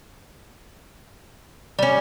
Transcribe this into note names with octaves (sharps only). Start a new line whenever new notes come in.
G3 C#4 D5